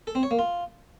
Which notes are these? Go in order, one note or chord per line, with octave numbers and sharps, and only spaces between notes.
A4
C4
C#5
A#3
F4